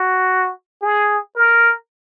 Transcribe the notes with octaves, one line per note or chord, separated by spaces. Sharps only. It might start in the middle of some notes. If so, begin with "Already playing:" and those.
Already playing: F#4
G#4
A#4